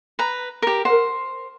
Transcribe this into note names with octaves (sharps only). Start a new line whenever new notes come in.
B4 A#5
G4 A#4
A#4 C5 F#5